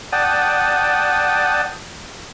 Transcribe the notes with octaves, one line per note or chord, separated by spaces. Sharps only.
D5 F#5 G5 A5 D#6